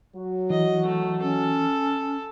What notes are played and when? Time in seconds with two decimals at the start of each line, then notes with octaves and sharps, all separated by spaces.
0.16 F#3 F#4
0.50 E3 D#5
0.86 A3
1.22 C#4 A4